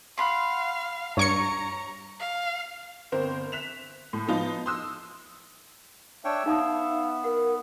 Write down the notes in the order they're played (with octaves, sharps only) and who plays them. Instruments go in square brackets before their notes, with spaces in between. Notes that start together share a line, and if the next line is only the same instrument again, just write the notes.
[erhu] F5 [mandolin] F#5 B5 C6
[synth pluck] G2 C#6 C#7 [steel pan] C#5 [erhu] A#5
[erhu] F5
[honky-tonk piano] G1 C4 A#4 C5
F#6 B6 E7 F7
A2
F3 B3 D#4 F4
C6 D#6 E6
[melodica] D4 C#5 G5 [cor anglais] E5
[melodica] B3 [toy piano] D#4 A5 D#6 [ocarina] F5
[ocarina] A#4 [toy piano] F#5